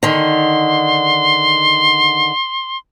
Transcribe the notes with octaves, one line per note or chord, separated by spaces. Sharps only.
D3 D#3 C6